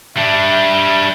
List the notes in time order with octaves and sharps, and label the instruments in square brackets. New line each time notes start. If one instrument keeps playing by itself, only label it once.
[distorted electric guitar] G3 D4 [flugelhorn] E5